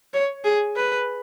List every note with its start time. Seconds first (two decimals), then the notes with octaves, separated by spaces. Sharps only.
0.14 C#5
0.44 G#4
0.76 B4